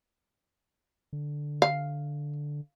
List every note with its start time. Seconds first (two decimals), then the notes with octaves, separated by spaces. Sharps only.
1.13 D3
1.62 F5